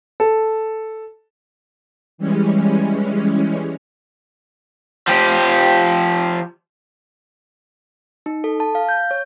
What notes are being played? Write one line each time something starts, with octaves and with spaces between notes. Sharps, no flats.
A4
E3 G3 G#3 C#4
F3 G4
D#4
A4
A5
F5
G6
C#5